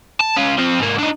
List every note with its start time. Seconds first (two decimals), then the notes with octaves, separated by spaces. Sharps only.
0.21 A5
0.37 C#4 F4
0.58 F3 C4
0.80 G#2 A#3
0.98 D4 D#4